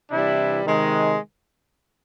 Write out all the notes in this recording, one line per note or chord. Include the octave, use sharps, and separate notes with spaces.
C3 E3 G3 D4 E4
C3 D#3 G#3